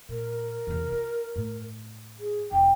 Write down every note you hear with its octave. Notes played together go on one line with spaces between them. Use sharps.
A#2 A#4
E2 C3
F4
A2
G#4
E1 G5